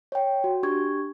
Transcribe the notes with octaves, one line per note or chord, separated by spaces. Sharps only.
C#5 G5
F#4
D4 G4 C#6 G#6